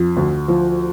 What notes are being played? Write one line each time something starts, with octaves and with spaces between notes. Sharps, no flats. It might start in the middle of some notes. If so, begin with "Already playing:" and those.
Already playing: F2
D2
F3